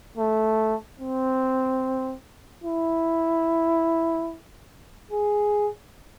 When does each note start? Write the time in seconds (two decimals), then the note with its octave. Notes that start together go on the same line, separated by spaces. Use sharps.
0.17 A3
1.00 C4
2.64 E4
5.11 G#4